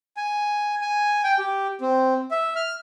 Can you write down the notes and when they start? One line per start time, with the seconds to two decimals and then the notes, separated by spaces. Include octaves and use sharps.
0.17 G#5
0.81 G#5
1.24 G5
1.39 G4
1.81 C4
2.31 E5
2.56 F6